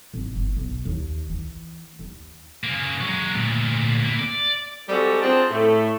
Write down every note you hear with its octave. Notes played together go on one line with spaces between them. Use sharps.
G#1
G1
B1
D#2
E3
D#2
C#3 A#3
F#3 G#3
D2 A#2
A#3 E4
D5
G3 G#3 C4 F#4 A4
C4 D4 F4 G#4 G5 A5
A2 A3